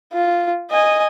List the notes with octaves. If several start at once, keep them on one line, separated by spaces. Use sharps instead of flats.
F4
D#5 G#5